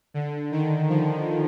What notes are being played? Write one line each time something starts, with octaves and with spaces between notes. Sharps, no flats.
D3
D#3
F3